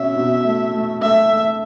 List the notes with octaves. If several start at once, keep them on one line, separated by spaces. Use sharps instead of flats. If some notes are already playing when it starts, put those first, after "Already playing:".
Already playing: B2 C#4 E5
B2
A3
A3
A3 E5
A3